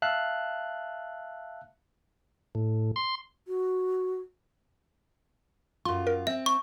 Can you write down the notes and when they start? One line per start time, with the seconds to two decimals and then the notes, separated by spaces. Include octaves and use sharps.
0.02 E5 F5 A5 F#6
2.55 A2
2.96 C6
3.48 F#4
5.85 F#2 F4 C6
6.07 A#4
6.27 C4 E5
6.46 C#6